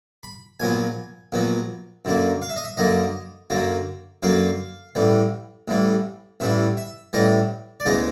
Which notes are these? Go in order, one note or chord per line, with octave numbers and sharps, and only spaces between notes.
B5
A#1 A#2 F#3 B3 G#5
A#1 A#2 F#3 B3
F#2 D3 F#3 A#3
F5
E5
D#5
E5
F#2 D3 F#3 A#3 D#5
F#2 D3 F#3 A#3
F#2 D3 F#3 A#3 F5
A1 A2 E3 G3
A1 A2 E3 G3
A1 A2 E3 G3 E5
E5
A1 A2 E3 G3 D#5
D5
D2 C#3 E3 G#3 B3 D#5